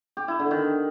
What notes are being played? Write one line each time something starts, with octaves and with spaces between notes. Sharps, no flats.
G4
E4
D3
D#3